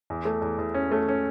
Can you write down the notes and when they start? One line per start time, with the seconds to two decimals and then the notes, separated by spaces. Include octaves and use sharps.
0.10 E2
0.25 A3
0.42 E2
0.58 E2
0.74 C#4
0.92 A3
1.08 C#4